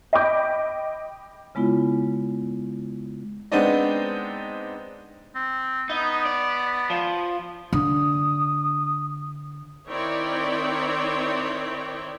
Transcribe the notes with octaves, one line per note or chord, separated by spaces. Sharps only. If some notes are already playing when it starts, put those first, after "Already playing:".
D#5 G5 B5 D6 G6
C#3 G#3 B3 E4 F4
G#3 B3 C4 D4 D#4 D#5
C4
B3 D#4
D5
F3
D3 D#6
D#3 C4 E4 C#5 D5 G5